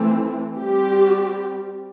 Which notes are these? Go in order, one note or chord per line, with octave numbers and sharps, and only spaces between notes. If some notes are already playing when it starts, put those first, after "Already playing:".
Already playing: E3 A3 C4
G3 C4 G4